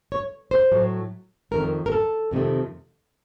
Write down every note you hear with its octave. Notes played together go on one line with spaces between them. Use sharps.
C#5
C5
A2 F#3 A3
C3 D#3 A3 A#4
F2
A#4
A4
F2 C3 D#3 A3